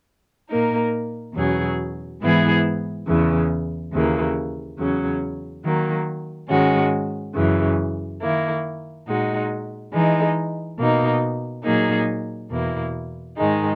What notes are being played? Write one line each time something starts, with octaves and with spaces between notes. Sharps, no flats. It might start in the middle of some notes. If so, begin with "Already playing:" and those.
A#2 A#3 D#4 A#4
E2 B2 F#3 C#4 G#4
G#2 E3 B3 E4 G#4
E2 C#3 E3
D#2 C#3 E3 A#3
E2 C#3 F#3 C#4
D#3 F#3 A#3
G#2 D#3 G#3 C#4 F#4
F#2 C#3 E3
D#3 A#3 E4
A#2 G#3 D#4 F#4
E3 G#3 D#4
B2 A#3 D#4
A#2 F#3 A#3 D#4 G#4
E2 B2 A#3 E4
G#2 D#3 G#3 D#4